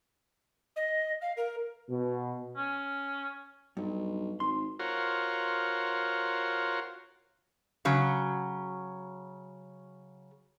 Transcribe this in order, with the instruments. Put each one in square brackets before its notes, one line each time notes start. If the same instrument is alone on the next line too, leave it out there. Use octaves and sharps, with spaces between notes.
[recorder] D#5
F5
A#4
[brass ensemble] B2
[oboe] C#4
[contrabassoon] B1 [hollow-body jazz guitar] G2
[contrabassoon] G#1 [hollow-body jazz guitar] C6
[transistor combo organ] F4 F#4 A#4 C5 C#5
[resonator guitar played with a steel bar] C#3 F#3